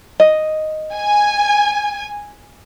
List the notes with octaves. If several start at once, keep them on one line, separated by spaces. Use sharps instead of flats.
D#5
G#5